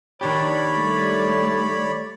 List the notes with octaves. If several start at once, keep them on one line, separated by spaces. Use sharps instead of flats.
D#3 D4 G4 C#5 D5 B5
G3 A3